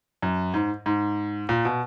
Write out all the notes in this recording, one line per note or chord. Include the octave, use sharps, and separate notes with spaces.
F#2
G#2
G#2
A#2
B2